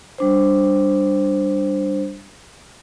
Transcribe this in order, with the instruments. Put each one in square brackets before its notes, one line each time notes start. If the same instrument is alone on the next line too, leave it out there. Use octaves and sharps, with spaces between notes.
[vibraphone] G3 D4 C5